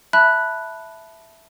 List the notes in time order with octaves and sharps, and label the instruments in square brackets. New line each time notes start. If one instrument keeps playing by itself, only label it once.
[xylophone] E5 A5 B5 F#6